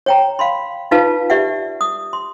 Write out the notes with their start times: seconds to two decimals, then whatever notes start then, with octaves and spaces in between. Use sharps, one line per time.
0.06 C#5 G5 A#5
0.39 F5 B5 C6
0.91 D#4 F4 B4 F5 A5
1.30 G4 D5 E5 F#5
1.81 D#6
2.13 C6